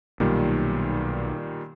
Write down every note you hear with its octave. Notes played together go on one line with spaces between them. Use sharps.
B1 A#2 D#3 G3